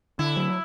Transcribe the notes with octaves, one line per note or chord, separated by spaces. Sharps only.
D3 E4
F#3